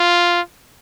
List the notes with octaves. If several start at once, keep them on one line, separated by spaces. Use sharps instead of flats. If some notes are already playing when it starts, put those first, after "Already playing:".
Already playing: F4